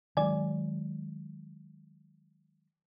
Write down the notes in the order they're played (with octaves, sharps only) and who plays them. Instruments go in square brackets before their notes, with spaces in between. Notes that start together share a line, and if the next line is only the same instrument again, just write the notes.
[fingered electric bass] D#3 F#3 G#3 [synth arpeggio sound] D5 G#5